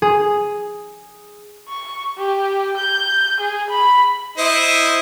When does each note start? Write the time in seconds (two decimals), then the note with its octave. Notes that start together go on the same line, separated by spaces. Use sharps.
0.02 G#4
1.69 C#6
2.17 G4
2.77 G6
3.40 G#4
3.70 B5
4.38 E4 C5 D#5